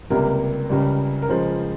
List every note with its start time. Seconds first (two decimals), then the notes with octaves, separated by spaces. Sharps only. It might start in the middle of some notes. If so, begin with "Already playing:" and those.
0.10 C#2 C3 G3 A#3 A#4
0.70 C#2 C#3 G3
1.22 A#4
1.29 C#2 C#3 F3 G#3 C5